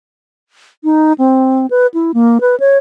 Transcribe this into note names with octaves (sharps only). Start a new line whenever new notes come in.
D#4
C4
B4
E4
A#3
B4
C#5